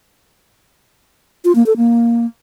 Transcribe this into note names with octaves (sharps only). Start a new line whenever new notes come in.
F4
A#3
A4
A#3